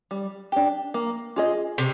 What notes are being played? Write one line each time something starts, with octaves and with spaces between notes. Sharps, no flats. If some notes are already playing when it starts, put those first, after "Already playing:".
G3
D4 G4
A#3
F4 G#4 D#5
C3